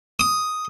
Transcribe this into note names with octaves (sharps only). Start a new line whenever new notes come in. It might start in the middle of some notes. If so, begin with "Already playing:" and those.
D#6